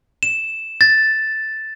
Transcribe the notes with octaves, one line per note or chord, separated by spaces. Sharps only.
E7
A6